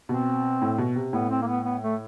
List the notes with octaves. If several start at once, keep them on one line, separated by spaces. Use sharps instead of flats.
B2 C4
A2
B2
C3
A2 B3
C4
A#3
B3
B3
A3